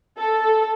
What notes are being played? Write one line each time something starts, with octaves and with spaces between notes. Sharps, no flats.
A4